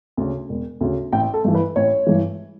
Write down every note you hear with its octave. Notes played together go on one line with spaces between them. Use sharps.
D2 C#3
E1
D2 C#3
A1 G5
A4
G2 E3
B4
A1 C#5
G2 E3